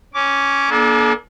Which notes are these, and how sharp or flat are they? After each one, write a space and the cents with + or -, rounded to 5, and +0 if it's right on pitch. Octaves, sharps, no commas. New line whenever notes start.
C#4 +0 D6 -15
A#3 +35 D4 +0 A4 -40